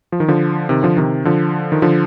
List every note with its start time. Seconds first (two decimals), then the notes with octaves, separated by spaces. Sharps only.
0.12 F3
0.20 D#3
0.28 D3 F3
0.69 C3 D#3
0.83 D3 F3
0.97 C3 D#3
1.25 D3 F3
1.72 D#3
1.82 D3 F3